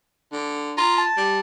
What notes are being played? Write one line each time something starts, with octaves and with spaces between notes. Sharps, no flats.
D3
F4 A#5
A5
G3